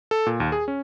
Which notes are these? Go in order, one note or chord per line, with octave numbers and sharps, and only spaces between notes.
A4
A#2
D#2
G#4
C#4